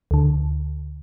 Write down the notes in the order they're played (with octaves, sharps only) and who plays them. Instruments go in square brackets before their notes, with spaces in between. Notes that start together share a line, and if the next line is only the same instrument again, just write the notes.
[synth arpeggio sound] D2 D3